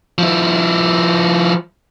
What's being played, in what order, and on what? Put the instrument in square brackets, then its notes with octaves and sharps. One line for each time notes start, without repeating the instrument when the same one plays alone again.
[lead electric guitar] F3 E4